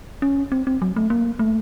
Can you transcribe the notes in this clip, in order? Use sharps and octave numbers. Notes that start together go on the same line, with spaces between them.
C#4
C4
C4
F#3
A3
A#3
A3